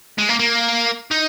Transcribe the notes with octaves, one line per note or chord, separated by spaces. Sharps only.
G#3
A#3
A#3
D#4